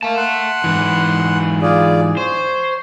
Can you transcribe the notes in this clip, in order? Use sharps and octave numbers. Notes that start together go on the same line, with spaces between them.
A#3 E5 A5
F#5 C6
G#2 E3
F4 G#4 D5
C5 C#5